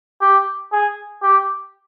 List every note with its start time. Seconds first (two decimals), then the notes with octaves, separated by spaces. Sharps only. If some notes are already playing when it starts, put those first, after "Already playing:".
0.21 G4
0.72 G#4
1.22 G4